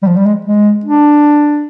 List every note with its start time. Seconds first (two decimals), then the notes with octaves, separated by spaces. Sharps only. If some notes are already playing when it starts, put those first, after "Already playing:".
0.02 G3
0.07 F3
0.16 G3
0.26 G#3
0.45 G#3
0.85 D4